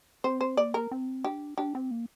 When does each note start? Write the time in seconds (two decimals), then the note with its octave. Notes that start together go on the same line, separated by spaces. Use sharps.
0.24 C4 C5
0.41 C5
0.57 A#3 D5
0.74 A#4
0.91 C4
1.24 D4 G4
1.58 D4 G4
1.75 C4
1.91 A#3